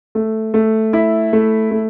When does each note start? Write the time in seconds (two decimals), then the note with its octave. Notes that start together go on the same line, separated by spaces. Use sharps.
0.15 A3
0.54 A3
0.93 E4
1.33 A3
1.71 A3